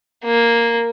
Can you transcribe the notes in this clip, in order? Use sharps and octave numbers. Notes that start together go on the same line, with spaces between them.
A#3